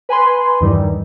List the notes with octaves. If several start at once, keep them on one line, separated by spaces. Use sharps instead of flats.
B4 G#5 B5 C6
E2 G2 D#3 E3 G3